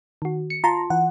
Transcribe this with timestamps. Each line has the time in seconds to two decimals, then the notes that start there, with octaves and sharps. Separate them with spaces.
0.22 D#3 F#4
0.50 C#7
0.64 F4 A5 A#5 C6
0.90 E3 F#5